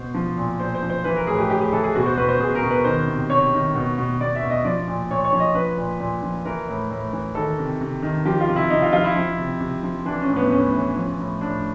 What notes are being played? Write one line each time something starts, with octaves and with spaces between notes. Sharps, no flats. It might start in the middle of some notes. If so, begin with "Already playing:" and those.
Already playing: B2 C5
F3
A#2
A#2 C5
C5
F3
C5
E3 B4
A#4
A2 G#4
G4
A2 G4
G#4
E3 A4
G#4
B2 F#4
C5
B2 B4
C5
B2 G#4
A#4
B2
B4
D#3 C5
C3
C3 C#5
D#3
B2
B2
B2 D5
E5
B2
D#5
F3 D5
A#2
A#2 C#5
C#5
F3
D#5
F3 B4
A#2
A#2
F3
E3 A#4
A2
A2
E3
D#3 A4
C3
C3
D#3
F3 G4
F4
C3
E4
C3 D#4
F4
F3 F4
E4
F3
C3
C3
F3
E3 D4
C#4
A2
B3
A2 C#4
E3
F3
A2
A2 D4